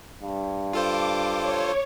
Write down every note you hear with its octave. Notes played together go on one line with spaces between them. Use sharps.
G2
F4 A4 C5 D6
C#5